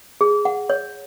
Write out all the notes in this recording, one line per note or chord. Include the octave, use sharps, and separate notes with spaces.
G#4
F#5
C#5